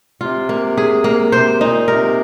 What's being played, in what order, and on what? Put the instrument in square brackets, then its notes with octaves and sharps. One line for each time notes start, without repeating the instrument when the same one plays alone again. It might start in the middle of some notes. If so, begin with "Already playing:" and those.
[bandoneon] C3 [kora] F4
[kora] A#3
G#4
A#3
[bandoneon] C3 [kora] C5
[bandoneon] A#2 [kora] D#4
[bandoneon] C3 [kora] A#4